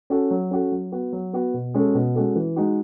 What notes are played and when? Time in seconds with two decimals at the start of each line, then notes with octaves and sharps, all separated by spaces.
0.10 C#4 F#4 A4
0.31 F#3
0.51 C#4 F#4 A4
0.72 F#3
0.92 B3 F#4
1.13 F#3
1.33 B3 F#4
1.54 B2
1.74 G#3 C#4 F#4 A4
1.95 B2
2.15 G#3 C#4 F#4 A4
2.36 E3
2.56 G#3 D#4 F#4